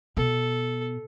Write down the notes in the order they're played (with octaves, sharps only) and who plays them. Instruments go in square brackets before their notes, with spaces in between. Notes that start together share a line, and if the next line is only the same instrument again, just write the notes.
[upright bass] B2 [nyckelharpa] A4